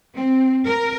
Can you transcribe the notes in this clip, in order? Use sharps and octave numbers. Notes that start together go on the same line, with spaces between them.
C4
A#4